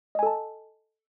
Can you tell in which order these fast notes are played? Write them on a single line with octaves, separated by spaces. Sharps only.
D#5 G#5 A4 A5